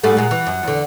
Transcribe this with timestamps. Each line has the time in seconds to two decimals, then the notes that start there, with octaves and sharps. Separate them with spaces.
0.03 G#2 G3 A3 F#5
0.17 A#2 G#3
0.31 E3
0.47 F#2
0.63 E2 D3